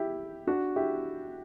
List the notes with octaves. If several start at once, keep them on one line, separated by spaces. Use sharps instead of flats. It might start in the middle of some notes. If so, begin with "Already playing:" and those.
Already playing: E4 G4
D4 F#4
E4 G4